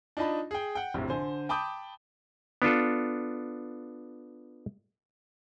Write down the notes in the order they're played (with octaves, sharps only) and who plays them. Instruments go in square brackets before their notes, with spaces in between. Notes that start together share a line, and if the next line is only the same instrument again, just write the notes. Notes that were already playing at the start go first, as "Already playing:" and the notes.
[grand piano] D4 D#4 F4 D#5 A5 B5
G#4 G5
F#5 G5
A#1 F2 A2 C3
D3 C5 G#5
G5 A5 B5 D6 D#6 G6
[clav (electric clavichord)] B3 D4 F4 A4